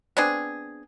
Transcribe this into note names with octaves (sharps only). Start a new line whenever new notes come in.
B3 C4 D4 G#4